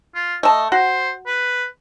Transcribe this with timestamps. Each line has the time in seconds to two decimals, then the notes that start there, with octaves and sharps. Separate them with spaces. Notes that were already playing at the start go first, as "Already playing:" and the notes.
0.15 F4
0.43 A3 D#5 A5
0.72 F#4 C5
1.26 B4